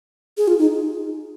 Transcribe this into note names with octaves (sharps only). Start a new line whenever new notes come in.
G#4
F4
D#4